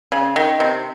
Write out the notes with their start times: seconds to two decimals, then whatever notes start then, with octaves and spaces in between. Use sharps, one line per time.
0.12 C#3
0.36 D#3
0.60 C3